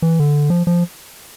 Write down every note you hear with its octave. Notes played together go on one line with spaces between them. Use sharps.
E3
D3
F3
F3